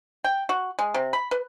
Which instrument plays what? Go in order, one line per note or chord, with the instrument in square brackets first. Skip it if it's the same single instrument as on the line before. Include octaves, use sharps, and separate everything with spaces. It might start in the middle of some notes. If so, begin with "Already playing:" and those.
[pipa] G5
F#4
G#3
C3
B5
B4